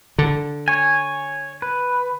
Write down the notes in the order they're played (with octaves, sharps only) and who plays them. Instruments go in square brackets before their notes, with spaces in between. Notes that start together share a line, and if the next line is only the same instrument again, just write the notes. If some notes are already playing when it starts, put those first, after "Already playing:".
[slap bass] D3
[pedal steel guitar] C#5 G#5
B4